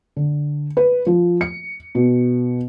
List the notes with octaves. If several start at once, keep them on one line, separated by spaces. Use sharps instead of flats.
D3
B4
F3
C#7
B2